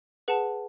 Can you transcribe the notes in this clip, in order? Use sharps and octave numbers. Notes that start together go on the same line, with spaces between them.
G#4 B4 F#5 A5